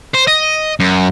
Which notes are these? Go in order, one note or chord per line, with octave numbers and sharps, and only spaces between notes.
C5
D#5
F#2